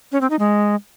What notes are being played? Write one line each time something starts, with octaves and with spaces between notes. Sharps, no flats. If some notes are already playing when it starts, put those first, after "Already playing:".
C#4
C4
D#4
G#3